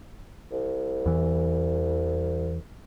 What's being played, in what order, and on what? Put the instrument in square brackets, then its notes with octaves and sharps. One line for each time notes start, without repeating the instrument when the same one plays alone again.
[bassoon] C2
[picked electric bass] E2 E3